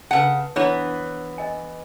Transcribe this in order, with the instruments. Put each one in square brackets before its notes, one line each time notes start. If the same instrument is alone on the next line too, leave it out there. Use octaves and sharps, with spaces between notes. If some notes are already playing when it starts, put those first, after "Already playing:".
[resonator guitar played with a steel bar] C#3 F#5 [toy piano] B4 A5
[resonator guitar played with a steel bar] E3 B3 [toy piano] D4 E4 C#5
[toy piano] D#5 G#5